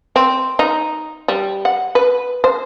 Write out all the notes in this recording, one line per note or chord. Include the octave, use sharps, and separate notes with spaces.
C4
D#4
G3
F#5
B4
C5